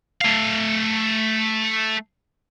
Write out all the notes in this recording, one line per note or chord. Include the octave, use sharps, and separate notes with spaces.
A3 F5